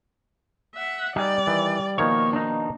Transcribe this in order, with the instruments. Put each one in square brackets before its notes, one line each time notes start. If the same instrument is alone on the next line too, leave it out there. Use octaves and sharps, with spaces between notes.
[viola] E5 F#5
[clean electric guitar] G3 [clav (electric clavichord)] D#4 G#5 [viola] D5
[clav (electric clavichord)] D#3 E3
[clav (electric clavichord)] B2 D#3 F3 [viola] A#3 [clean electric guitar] C#5
[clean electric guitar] D4 D#4